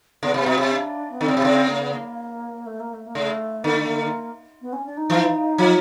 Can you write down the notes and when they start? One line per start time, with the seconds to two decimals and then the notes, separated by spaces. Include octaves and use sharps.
0.23 C#3 B3
0.34 C3 B3
0.46 B2 C4
0.58 C3
0.71 D4
1.11 B3
1.20 D3 C4
1.28 C#3
1.37 C3
1.45 C#3
1.69 A#3
1.80 B3
1.91 A#3
2.66 A3
2.80 A#3
2.93 A3
3.06 A#3
3.15 C#3 A3
3.63 D3 B3
3.71 A#3
3.78 A3
3.85 A#3
4.61 B3
4.73 C#4
4.85 D4
4.97 D#4
5.10 E3
5.58 F3